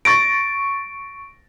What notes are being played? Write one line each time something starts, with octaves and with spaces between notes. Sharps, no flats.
C#6 A6 A#6 D7